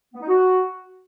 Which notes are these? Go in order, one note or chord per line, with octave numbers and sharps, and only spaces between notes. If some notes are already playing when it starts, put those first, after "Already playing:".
B3
D#4
F#4